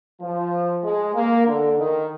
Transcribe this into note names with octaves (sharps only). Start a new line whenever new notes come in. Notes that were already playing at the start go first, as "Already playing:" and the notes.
F3
G#3
A#3
D3
D#3